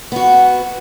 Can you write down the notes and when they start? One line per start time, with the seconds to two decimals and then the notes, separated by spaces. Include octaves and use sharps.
0.12 B3 F#4